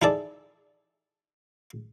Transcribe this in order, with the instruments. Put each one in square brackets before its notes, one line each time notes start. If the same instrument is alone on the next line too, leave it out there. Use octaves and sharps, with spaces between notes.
[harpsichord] D#4 E4 G#4 A4 D5